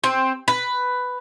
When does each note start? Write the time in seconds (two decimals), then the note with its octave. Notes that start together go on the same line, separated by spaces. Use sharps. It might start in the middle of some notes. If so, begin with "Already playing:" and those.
0.04 C4
0.48 B4